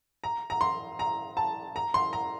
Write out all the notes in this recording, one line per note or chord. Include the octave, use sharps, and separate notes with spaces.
A#5
A#5
C6
A#5
A5
A#5
C6
A#5